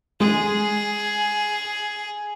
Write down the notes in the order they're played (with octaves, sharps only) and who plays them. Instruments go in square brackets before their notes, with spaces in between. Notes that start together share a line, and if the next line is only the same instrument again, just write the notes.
[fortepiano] G#3 [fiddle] G#4